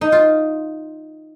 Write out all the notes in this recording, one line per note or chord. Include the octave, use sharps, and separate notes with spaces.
D#4
F4